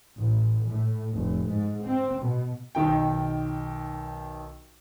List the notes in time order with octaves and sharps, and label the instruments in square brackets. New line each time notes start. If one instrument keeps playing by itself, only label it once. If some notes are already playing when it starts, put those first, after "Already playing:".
[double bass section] A1
A2
F1
G#2
C4
B2
[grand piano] B1 D#3 G5